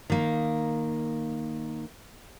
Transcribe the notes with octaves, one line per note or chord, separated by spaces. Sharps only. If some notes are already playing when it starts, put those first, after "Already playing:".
D#3 A#3